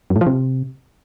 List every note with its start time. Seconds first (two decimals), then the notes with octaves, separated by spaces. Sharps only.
0.10 F#2
0.16 A2
0.21 F3
0.27 C3